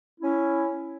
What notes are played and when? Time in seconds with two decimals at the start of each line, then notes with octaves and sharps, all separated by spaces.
0.21 C#4 E4